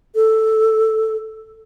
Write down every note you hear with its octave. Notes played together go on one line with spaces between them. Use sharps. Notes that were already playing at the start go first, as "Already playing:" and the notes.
A4